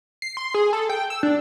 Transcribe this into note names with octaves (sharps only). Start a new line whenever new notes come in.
C7
C6
G#4
A4
G5
E6
D4